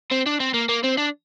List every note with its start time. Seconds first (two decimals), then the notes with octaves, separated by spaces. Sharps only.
0.11 C4
0.26 D4
0.40 C4
0.54 A#3
0.69 A#3
0.84 C4
0.97 D4